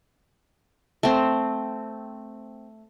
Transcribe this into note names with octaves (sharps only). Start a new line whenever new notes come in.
A3 C4